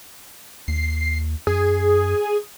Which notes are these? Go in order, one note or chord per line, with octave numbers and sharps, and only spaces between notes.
D#2 C7
F#2 G#4